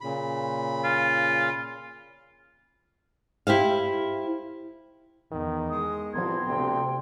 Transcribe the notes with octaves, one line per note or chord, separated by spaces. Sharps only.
A#2 C#3 B5
F4
E4 G4 C5 F5
E2 D#3
G#3 D#6
C2 F3 B3 C4 A#5 C6 G#6
D2 C3 G5